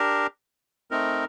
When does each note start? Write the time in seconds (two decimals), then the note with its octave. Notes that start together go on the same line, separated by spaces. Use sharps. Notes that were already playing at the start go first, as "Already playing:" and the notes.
Already playing: D4 G4 A#4
0.91 A3 C4 D#4 A#4